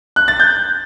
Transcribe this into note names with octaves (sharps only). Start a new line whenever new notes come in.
F#6
A6
G6